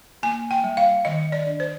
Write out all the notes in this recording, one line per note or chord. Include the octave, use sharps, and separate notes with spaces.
A#3 G#5
G5
G3
F5
D#3 D#5
D5
D4
C5